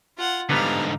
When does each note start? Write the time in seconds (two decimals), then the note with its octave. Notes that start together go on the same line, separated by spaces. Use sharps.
0.18 F4 F#5
0.50 G#2 D3 G3 B3 B4 F5 A#5